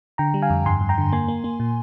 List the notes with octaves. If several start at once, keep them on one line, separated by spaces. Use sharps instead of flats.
D3 G5 A#5
G3
F5 G#5
F2
G2 G#5 C6
G2
G5 A#5
D3
A#3 G#5 C6
A#3
A#3
A#2